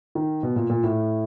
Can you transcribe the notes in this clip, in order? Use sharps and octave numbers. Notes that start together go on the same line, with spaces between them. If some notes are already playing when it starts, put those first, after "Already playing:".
D#3
B2
A#2
A#2
A2